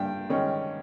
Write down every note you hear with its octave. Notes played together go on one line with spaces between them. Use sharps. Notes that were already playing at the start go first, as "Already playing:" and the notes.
Already playing: G2 G5
D#3 G#3 C#4